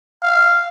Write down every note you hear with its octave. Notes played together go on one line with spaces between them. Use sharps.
F5